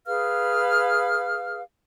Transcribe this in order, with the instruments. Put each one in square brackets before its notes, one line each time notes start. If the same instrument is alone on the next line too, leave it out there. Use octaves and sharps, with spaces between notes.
[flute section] G#4 B4 F5 F6